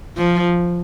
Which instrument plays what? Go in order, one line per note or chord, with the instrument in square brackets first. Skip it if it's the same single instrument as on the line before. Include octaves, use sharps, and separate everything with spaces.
[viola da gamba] F3